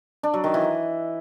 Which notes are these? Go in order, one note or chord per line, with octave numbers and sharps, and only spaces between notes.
D4
F#3
D#3
E3